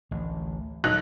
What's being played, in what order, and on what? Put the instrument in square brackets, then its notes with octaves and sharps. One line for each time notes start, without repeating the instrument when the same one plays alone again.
[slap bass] A1 D2
[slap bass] D#1 B2 [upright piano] B1 D#4 [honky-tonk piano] F#6